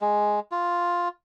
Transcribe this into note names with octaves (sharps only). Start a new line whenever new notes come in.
G#3
F4